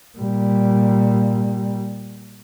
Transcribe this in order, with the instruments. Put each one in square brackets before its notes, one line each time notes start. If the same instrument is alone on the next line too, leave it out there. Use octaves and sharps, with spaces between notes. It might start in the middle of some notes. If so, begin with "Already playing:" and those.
[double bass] A#2 G3